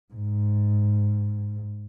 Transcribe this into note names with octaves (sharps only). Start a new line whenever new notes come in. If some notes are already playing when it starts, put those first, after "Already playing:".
G#2